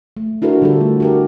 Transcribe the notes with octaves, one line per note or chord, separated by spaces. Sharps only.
A3
D4 E4 F#4 A4 A#4 C5
D3 G3 F4 G4 A4
A3
F#4 G4 A#4